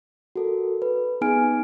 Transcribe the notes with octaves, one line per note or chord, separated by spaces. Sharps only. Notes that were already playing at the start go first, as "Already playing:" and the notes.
F#4 A4 A#4
B4
B3 D#4 G#4 G#5 F6 D7